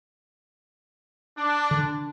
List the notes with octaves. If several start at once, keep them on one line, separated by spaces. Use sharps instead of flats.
D4
D3